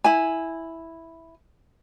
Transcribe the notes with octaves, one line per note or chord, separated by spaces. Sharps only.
E4 G#5